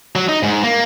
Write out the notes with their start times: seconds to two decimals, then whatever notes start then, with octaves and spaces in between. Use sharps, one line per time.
0.16 F#3
0.29 D#4
0.43 G#2
0.63 A#3